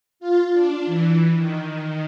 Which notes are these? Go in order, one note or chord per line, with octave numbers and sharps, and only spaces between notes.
F4
D4
E3
D#3